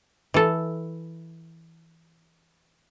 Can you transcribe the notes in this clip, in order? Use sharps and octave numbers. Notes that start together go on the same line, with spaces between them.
E3 A4